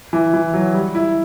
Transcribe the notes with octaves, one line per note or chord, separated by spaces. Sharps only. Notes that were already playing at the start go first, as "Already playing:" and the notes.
E3
E3
F#3
G3
E4